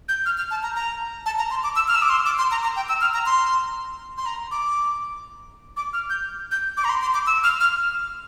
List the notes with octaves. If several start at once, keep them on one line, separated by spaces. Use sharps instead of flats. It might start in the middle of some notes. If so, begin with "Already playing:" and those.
G6
F6
F6
A5
A#5
A#5
A5
A#5
C6
D6
E6
F6
E6
D6
C6
D6
C6
A#5
A#5
G5
E6
F6
A#5
C6
C6
A#5
D6
D6
F6
G6
G6
D6
A#5
C6
C6
D6
E6
F6
F6